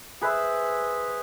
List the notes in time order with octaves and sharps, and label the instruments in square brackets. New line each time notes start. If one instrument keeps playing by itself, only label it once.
[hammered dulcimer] G#4 B4 C5 E5